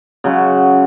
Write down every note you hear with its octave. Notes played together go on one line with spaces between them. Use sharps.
C#3 F#3 G#3 F#4